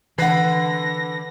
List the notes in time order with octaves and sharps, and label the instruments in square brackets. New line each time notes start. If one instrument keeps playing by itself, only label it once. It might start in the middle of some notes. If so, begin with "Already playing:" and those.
[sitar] D3 B4 [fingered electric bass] E3 [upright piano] F#5 C7 [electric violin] A#6